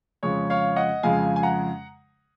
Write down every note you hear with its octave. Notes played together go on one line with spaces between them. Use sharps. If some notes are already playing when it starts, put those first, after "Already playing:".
F2 C#3 G#3 C#5
C#5 F5
D#5 F#5
F2 C#3 G#3 F5 G#5
G#5
F#5 A#5